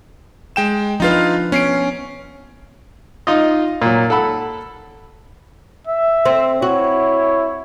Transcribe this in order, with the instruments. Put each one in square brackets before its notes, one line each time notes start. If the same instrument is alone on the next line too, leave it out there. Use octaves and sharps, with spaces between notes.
[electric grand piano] G#3 G5 E7
[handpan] F3 D4 B4 [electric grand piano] D#4 F4 F5
[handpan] B3 [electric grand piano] C#4 C7 D7
[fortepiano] D#4 F4 D#5
A#2 F#3
A4 F#5 B5 E6
[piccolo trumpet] E5
[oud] C4
[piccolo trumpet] E4 [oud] F#4 [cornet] C#5